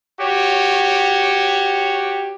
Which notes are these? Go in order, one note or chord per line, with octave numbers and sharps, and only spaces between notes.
F#4 G4 C#5